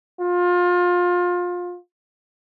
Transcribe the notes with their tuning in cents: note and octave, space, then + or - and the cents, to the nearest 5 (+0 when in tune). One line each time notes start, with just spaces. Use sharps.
F4 +25